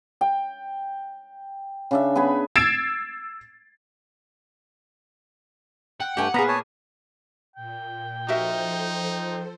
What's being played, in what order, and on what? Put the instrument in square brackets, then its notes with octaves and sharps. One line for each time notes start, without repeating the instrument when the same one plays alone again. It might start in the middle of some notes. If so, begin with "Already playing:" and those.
[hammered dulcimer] G5
C#3 D4 E5
B3 G#4 G#5 B5
[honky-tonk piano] E6 G#6 A6 C7 D7 E7
[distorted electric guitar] F#5 [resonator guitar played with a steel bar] G5
[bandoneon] G2 A3 G5 [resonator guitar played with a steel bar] G4 G#5
[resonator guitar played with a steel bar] A#2 A#3 G#4 [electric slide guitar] B3 B4 [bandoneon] A#5
[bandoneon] C#5 G#5 A5
[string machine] A#2 [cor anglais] G5
[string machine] F3 A4 C5 [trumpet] D#4 [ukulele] F#4 A#4 E5